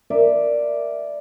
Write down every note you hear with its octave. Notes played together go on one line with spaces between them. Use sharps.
A#4 D5 E5